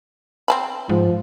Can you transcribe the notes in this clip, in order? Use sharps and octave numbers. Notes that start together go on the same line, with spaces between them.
C4 A5 B5
G#2 F3